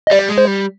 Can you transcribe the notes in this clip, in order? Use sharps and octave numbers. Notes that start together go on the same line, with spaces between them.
D#5
G3 D5
G#3
C5
G3